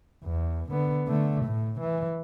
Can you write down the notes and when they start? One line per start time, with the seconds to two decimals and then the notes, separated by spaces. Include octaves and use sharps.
0.24 E2
0.71 D3 B3
1.08 D3 A3
1.45 A2
1.81 E3